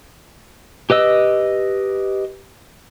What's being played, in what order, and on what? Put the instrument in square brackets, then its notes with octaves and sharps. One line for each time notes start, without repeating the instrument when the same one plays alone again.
[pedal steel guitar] G4 B4 D#5 E6